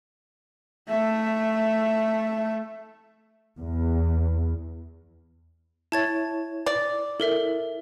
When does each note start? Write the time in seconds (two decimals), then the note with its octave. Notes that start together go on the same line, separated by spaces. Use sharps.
0.89 A3 E5
3.59 E2
5.92 E4 C#5 A5 G#6 A6
6.66 D5
7.20 E4 A4 A#4 E5